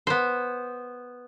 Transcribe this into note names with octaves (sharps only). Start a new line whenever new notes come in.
B3 C5